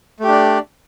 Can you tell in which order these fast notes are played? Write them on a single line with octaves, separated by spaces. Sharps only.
A3 G4 D4 D5